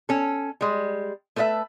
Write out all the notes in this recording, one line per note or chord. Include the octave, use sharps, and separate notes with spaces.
C#4 A4
G3 G#3
A3 A4 B4 D#5 E5